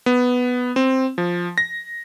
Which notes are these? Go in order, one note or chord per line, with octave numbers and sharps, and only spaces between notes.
B3
C4
F3
A#6